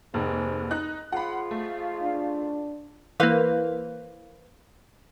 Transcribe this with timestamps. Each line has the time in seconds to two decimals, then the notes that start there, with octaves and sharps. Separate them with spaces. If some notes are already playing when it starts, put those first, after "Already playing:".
0.14 F1 D#2 G#2
0.71 D#4 F#6
1.12 F3 G#3 F4 F#5 B5
1.51 A3
2.02 D4
3.20 E3 A#3 B4 C5 F5